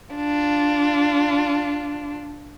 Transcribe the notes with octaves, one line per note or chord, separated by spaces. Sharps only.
D4 F4